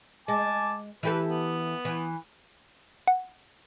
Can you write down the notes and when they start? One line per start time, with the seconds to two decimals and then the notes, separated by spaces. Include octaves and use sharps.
0.28 G#3 G#5 A5 D6
1.03 E3 G4 A4 B4
1.26 B3
1.85 E3
3.07 F#5